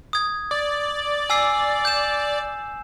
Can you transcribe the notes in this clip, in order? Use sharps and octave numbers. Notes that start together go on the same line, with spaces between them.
D#6 G#6
D5
G#5 E6 C7
G6 E7